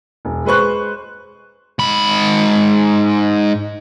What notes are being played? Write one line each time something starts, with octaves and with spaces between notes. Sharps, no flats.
E1
G#3 B4 C5 C#6 F#6
G#2 B5